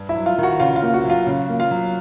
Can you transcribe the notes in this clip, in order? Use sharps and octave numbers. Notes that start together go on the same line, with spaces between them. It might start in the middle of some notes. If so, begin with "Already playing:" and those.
Already playing: G2
E4 E5
F#3
F4 F5
D#3
F#4 F#5
C#3 F4 F5
F4 F5
A#3
F#4 F#5
F#3 F4 F5
C#3
A#3
F4 F5
F#3